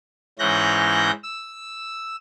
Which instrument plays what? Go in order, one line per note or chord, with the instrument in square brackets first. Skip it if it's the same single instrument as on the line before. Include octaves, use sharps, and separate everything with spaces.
[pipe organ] G#2 E3 C#4 F#6 G6 A#6
E6